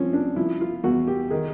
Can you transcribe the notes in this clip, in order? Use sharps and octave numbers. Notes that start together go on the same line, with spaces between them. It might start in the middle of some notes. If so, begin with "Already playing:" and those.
Already playing: F3 C4 C#4
D4
F3 E4
F4
E2 F#4
G4
D#3 G#4